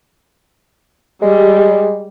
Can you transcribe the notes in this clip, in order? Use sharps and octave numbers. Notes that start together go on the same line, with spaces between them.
G3 G#3